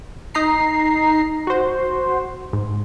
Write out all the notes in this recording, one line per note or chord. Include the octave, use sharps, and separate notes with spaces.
D#4 A#5 C7
F#4 C5
G#2